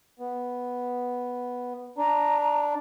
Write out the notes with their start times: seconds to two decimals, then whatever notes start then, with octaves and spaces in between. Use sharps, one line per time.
0.20 B3
1.98 D4 A#5